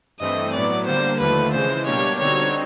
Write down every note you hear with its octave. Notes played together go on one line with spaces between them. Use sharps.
G2 E3 A3 C4 D#5
A2 F#3 B3 D5
D3 G3 A#3 C5
D#2 D3 F3 A3 B4
C#3 E3 G#3 C5
B2 G3 A#3 D4 G4 C#5
D3 G3 C4 D#4 F#4 C#5